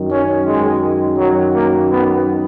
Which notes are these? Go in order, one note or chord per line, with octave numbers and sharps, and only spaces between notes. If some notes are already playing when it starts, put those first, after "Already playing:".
Already playing: F#2 D#3
C#4
G#3
F#3
A#3
B3